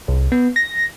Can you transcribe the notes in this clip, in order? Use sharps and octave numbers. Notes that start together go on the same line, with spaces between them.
C2
B3
A#6